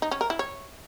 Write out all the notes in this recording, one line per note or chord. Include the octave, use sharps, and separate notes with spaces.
D#4
C#4
A#4
E4
C#5